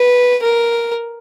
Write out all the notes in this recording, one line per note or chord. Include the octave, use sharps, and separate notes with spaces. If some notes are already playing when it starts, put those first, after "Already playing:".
Already playing: B4
A#4